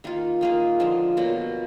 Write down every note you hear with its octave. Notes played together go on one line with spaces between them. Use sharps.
D#3 A#3 F4
D#3 A#3 F4 G#4
D3 F3 G#3
B2 F#3 A#3